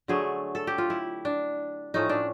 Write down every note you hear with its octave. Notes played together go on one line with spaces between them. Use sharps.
D3 F#3 A3 G#4
A4
G4
F4
E4
D4
A2 F3 A3 C#4 D#4
D4